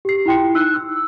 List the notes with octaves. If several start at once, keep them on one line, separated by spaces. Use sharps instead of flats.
G4 C7
E4 F4 G5 C6 C#7
D#4 E6 F#6
E6